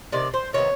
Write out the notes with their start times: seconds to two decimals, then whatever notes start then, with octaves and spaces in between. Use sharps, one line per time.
0.12 C3 D#3 D5
0.34 C5
0.53 C3 D#3 B3 C#5